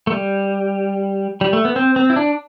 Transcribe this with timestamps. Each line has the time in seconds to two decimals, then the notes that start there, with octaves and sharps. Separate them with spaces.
0.07 A3
0.12 G3
1.41 G3
1.53 A3
1.65 B3
1.76 C4
1.96 C4
2.10 E4
2.16 D4